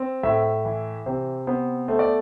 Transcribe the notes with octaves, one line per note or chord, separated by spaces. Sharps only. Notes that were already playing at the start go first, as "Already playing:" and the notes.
Already playing: C4
A2 E5
E3
C3 C5
B3 C5
A3 C5
D5